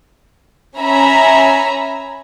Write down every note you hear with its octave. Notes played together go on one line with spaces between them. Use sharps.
C#4 E5 G#5 A#5 B5